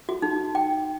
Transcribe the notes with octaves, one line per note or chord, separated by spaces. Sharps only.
F#4
D#4
G5